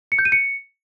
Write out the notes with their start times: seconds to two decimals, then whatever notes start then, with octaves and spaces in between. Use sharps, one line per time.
0.12 C#7
0.19 G6
0.25 D#7
0.32 C#7